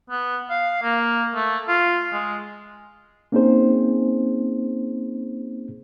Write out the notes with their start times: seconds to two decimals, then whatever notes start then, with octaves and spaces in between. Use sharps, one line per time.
0.10 B3
0.50 F5
0.83 A#3
1.35 A3
1.68 F4
2.12 G#3
3.32 A#3 C4 C#4 D#4 G#4 C5